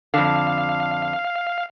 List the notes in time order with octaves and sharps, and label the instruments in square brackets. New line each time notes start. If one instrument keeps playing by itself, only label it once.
[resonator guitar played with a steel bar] F2 D3 [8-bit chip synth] F5